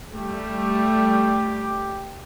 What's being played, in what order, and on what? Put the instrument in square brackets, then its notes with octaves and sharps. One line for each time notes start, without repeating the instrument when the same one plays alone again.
[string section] G3 A3 [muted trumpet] G4